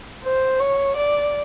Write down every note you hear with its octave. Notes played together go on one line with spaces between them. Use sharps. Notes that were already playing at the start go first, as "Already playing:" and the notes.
C5
C#5
D5